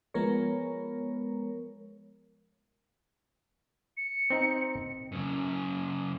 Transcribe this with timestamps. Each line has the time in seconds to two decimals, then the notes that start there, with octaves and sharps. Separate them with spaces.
0.14 F3 G#3 B3 A#4 C#5
3.97 C#7
4.30 C4 D#4
5.12 F#2 C#3